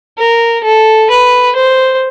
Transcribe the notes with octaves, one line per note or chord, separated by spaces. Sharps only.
A#4
A4
B4
C5